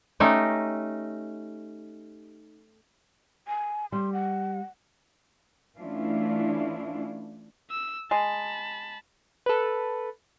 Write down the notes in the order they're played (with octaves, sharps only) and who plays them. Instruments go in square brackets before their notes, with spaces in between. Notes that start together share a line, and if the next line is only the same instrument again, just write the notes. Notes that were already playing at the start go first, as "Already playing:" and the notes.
[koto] A3 C#4 D#4 G4
[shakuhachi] G#5
[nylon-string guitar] G3 [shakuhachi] C6
[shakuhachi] F#5
[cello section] E3 A3 C#4 D4 E4 F4
[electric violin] E6
[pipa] G#3 [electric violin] A5 B5
[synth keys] A4 B4